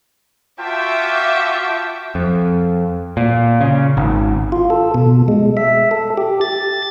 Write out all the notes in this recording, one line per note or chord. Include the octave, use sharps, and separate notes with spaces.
F4 F#4 E5 G5 A5 D6
F2
A#2
C#3
G#1
F4
A4
B2
G#3
E5
A4
G4
A6